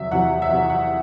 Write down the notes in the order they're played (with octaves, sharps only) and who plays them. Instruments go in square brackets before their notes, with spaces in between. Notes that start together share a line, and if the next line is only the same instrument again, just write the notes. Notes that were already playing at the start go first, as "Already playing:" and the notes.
Already playing: [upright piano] E2 C3 F#3 E5
E2 C3 F#3 F#5
E5
E2 C3 F#3 F#5
F#5